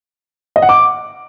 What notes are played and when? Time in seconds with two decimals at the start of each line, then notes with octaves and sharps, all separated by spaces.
0.56 D#5
0.62 F#5
0.69 D6